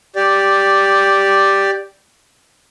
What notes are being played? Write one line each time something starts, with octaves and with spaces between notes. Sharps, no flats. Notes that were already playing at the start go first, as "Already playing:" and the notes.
G4 D5